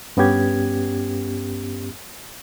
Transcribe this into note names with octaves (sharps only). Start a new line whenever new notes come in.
G2 B3 C#4 G4 G#6